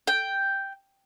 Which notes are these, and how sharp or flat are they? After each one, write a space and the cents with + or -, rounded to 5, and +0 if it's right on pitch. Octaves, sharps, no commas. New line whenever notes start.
G5 +0